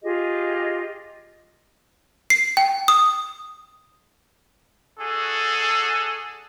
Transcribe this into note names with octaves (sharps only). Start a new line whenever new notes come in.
F4 G4 G#4 D#5
C7
G5
D#6
D4 F#4 G#4 A4